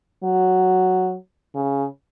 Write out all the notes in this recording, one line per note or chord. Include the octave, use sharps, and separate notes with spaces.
F#3
C#3